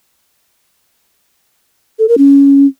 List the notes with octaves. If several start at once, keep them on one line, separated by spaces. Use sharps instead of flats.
A4
A#4
C#4